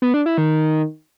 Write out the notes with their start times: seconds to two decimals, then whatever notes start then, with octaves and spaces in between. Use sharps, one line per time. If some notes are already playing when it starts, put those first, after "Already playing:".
0.02 B3
0.14 D4
0.26 E4
0.38 D#3